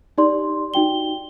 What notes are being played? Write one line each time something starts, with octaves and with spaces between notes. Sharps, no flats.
D#4 G4 D5 C6
D#4 F#4 G5 G7